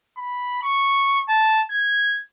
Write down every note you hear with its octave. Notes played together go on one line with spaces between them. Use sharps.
B5
C#6
A5
G#6